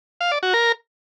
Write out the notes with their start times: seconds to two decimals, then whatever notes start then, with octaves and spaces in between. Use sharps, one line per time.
0.21 F5
0.32 D5
0.43 F#4
0.54 A#4